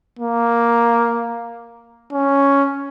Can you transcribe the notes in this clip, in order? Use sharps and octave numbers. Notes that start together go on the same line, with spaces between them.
A#3
C#4